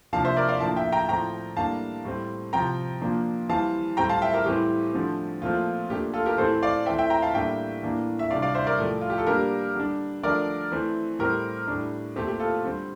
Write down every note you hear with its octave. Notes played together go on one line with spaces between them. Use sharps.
C3 F3 A#3 D4 F5 A5
C5 E5
A#4 D5
D5 F5
A2 F3 A#3 D4 F5 A5
E5 G5
G5 A#5
A2 F3 C4 G5 A#5
A2 G3 A#3 D4 F5 A5
A2 G3 C4
C3 F3 C4 G5 A#5
A#2 F3 A#3 D4
E3 G3 C4 F5 A5
A2 G3 C4 G5 A#5
F5 A5
E5 G5
G4 A#4
A2 E3 G3 C4 G4
D3 F3 A3 C4
A#2 F3 A3 C4 F4
A#2 A3 D4 G4
F4 A4
G4 A#4
A2 E3 A3 C4 A4 C5
D5 F5
E3 A3 C4 E5 G5
E5 G5
G5 A#5
F5 A5
A2 G3 A#3 D4 E5 G5
A2 E3 A#3 D4
E5
C3 G3 D4 D5 F5
D5 F5
C5 E5
A#4 D5
A2 F3 A3
F4
G4
A4
D3 G3 A#3 D4 G4 A#4
D3 G3 D4
D3 F3 A3 D4 A#4 D5
E3 A3 C4
A2 G3 C4 G4 A#4
A2 G3 D4
A#2 A3 C4 G4
G4
F4 A4
D3 G3 C4